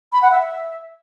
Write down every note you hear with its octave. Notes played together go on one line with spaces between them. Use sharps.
B5
F#5
E5